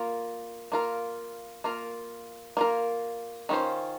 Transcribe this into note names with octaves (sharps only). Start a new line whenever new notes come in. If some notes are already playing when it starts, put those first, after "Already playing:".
Already playing: A#3 F4 A#4
A#3 F4 A#4
A#3 F4 A#4
A#3 F4 A#4
D#3 A#3 C#4 F4 C5